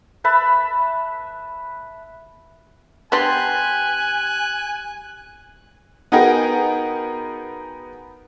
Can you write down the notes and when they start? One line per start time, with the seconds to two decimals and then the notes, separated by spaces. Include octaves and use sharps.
0.24 B4 E5 A5 B5
3.12 B3 D4 G4 G#5 C6 F#6
6.12 B3 D#4 F#4 G#4 A#4 G5